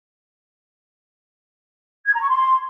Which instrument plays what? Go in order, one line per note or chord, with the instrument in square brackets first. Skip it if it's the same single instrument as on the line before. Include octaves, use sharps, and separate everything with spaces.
[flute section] G#6
A#5
C#6
C6